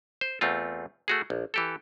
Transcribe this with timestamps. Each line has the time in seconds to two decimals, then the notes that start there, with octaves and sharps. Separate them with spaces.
0.21 C5
0.41 E2 A3 C4 F4
1.08 A3 F#4 G#4
1.30 A#1
1.54 E3 G4 A4